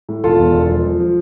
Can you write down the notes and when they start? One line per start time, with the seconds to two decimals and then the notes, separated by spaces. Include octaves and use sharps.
0.09 A2
0.24 E1 F4 A4
0.39 E2
0.54 E1
0.70 F3
0.85 F3
1.00 F3